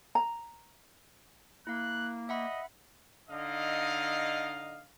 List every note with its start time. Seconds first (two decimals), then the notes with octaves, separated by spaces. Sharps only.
0.15 A#5
1.67 A#3 E4 F5 F#6
2.29 D#5 E5 F#5 B5
3.30 D3 D#4 D#5 F5